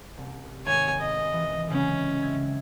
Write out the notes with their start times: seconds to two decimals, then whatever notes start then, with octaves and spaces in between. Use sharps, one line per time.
0.17 C2
0.66 G#1 C#5 G#5
1.00 D#5
1.33 E3
1.70 C#3 F#3 G#3 C#4
2.22 C4 E5 G#6